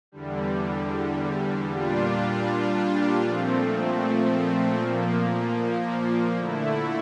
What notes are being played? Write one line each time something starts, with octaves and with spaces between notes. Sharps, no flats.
E2 D3 G3
A#2 G3 D4 F4
A#2 F3 A3 C4
A#2 F3 A#3
D3 A3 E4